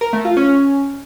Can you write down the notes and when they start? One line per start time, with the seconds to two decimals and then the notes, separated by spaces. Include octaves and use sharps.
0.01 A#4
0.13 A3
0.25 F4
0.37 C#4